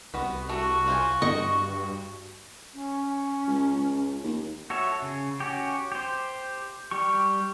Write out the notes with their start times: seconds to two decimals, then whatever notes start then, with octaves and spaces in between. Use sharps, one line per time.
0.14 C2 B3 F#4 B4
0.49 A3 F#4
0.88 F4 C5 G#5
1.22 G2 D#5 C#6
2.74 C#4
3.48 C#2
3.76 C#2
4.23 D#2
4.70 F#4 A4 C#5 E5
5.02 C#3
5.40 C#4 F#4 G4
5.92 G4 C5
6.91 G3 G4 C#6